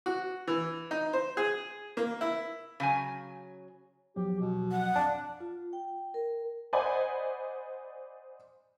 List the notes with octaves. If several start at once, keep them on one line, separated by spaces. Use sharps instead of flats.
F#4
E3
D#4
C5
G#4
A#3
E4
C#3 F#3 G#5
E2 F3 F#3 G4
B2
F#5
G#1 F2 D4 F5
F4
G5
A#4
C5 D5 D#5 F#5 G#5 B5